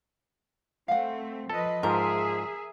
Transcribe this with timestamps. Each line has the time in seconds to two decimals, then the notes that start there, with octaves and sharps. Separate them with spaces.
0.88 A3 C4 F5 F#5
1.50 F3 A4 B4 D#5
1.83 G#2 F3 G#4 A#4 E5